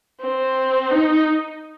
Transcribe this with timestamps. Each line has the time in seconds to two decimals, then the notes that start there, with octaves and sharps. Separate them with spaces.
0.22 C4
0.91 D#4